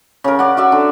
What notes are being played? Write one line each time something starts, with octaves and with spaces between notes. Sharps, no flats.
C#3 A#4
D5 F#5
F#4 D5 E5
D3